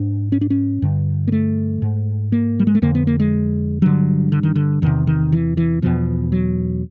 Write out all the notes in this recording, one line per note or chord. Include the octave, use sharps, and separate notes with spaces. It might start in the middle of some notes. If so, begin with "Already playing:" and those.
Already playing: G#2 D4
C#4
D4
C#4
G2 D3
A#3
A3
G#2
A#3
G3
G#3
A3
F2 D3 A#3
B3
A#3
G#3
G2 D3 F#3
D3
D#3
D3
E2 C3 D#3
D#3
E3
E3
E2 B2 F3
F#3